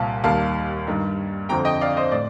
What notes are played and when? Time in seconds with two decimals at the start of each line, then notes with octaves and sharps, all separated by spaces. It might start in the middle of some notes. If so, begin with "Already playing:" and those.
Already playing: C2 A#2 G3 F5 A5
0.24 D#2 D#3 G3 F5 A5
0.87 G2 D#3 G3
1.49 F2 D3 F3 G5 A#5
1.65 D#5 G5
1.81 D5 F5
1.97 C5 D#5
2.12 A2 D5